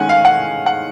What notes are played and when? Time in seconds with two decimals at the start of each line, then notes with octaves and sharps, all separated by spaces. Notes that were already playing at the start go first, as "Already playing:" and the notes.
Already playing: D#3 G#3 C#4 F#5 G#5
0.09 F5
0.25 F#5
0.66 F#5